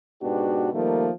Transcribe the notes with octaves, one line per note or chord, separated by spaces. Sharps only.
G#2 B2 B3 D4 F#4 G4
D#3 F3 G3 A3 A#3